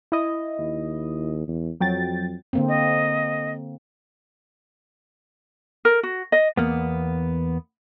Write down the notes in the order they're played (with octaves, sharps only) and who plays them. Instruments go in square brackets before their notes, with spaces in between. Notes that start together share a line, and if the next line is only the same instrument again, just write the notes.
[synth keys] E4 D#5
[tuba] D#2
E2
[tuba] F2 [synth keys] F#3 G5 A6
[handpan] D3 A#3 C4
[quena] D#5
[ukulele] A#4
F#4
D#5
[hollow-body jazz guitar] E2 A#3 B3